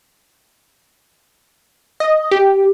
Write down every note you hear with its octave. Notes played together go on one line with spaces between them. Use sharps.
D#5
G4